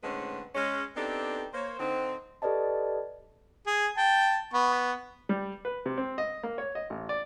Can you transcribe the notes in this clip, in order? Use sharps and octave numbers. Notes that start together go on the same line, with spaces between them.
A2 D3 G#3 C4 C#4 B4
G#3 C#4
B3 C4 D4 D#4 G4 A4
A#3 C5 C#5
D3 C4 D#4
G4 A4 B4 D5 D#5 A5
G#4
G5 A5
B3 C#6
G3
B4
C3
C4
D#5
A#3
C#5
D#5
A1
D5